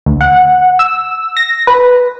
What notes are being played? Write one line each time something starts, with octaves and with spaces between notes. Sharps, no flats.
D2
F#5
E6
A#6
B4